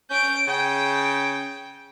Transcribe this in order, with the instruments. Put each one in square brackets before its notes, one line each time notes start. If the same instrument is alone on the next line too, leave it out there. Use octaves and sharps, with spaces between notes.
[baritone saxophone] C#4 [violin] G6 D7
[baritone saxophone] C#3 [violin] G5